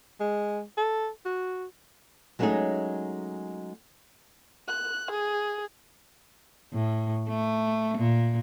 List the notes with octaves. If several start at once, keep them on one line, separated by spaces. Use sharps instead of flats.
G#3
A4
F#4
F#3 G#3 A3 C#4 D#4 G#4
F#6
G#4
A2
A3
A#2